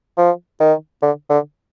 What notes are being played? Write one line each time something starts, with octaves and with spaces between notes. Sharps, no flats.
F3
D#3
D3
D3